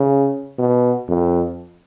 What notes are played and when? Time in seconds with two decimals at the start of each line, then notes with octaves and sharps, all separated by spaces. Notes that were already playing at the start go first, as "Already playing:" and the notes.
Already playing: C#3
0.58 B2
1.08 F2